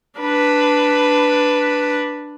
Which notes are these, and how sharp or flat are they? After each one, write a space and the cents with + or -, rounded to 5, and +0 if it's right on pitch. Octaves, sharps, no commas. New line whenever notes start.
D4 +0 B4 +0